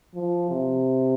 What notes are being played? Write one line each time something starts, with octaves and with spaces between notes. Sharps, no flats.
F3
C3